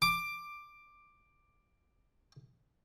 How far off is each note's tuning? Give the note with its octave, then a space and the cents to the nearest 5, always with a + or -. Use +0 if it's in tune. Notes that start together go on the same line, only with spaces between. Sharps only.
D6 +10